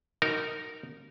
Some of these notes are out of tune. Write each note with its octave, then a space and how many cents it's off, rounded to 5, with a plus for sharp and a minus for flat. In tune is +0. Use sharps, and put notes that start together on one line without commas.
D#4 +0 F#4 +10 A#4 -15